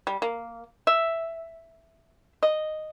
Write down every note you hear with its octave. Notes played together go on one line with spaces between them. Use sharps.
G3
A#3
E5
D#5